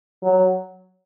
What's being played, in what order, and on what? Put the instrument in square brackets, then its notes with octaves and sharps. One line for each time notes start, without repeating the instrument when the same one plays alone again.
[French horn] F#3